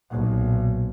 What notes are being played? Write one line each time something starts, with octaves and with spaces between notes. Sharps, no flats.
B1 A#2